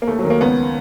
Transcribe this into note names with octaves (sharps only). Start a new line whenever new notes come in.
A#3
D#2 A3
F#3
D#3
A#3
C#2 B3